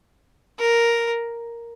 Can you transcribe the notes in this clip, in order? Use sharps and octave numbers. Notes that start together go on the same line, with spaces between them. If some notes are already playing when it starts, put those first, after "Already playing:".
A#4